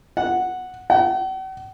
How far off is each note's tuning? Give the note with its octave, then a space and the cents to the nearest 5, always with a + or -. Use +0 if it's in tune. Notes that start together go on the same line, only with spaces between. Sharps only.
F#5 -5
F#5 +45